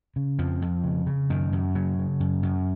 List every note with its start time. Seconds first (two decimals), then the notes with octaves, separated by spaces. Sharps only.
0.16 C#3
0.39 F2 F3
0.62 F2
0.84 C#3
1.06 C#3
1.30 F#2 D#3
1.52 F#2
1.75 C#3 F#3
1.98 C#3
2.20 F#2
2.43 F#2